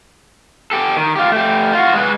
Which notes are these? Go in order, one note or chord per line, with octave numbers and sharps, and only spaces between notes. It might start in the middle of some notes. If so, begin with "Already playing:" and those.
G4 A4
D#3
F4 G4
A3 G4
F4 F#4
G#3 B4